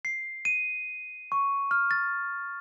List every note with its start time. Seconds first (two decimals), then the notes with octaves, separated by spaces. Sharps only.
0.05 C7
0.45 D#7
1.32 C#6
1.71 F6
1.91 A6